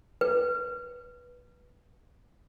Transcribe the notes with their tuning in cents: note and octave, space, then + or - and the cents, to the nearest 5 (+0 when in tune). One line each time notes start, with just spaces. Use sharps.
B4 -15